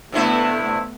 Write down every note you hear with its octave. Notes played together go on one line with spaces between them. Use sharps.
G2 C3 A3 B3 E4